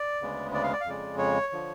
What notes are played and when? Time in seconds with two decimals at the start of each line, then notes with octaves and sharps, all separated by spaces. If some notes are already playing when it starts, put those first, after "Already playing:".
Already playing: D5
0.22 D2 C#3 G#3 B3
0.54 D5
0.63 F5
0.73 D5
0.81 F5
0.86 F2 C#3 G#3 D5
1.18 C#5
1.53 D3 F3